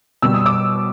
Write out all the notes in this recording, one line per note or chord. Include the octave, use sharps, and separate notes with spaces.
B2 G3 E6
D#6
D6 E6